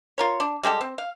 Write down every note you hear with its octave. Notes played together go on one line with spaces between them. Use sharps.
F4 A#4 C#5
D4
G3 G#3 G4 A4
C4
F5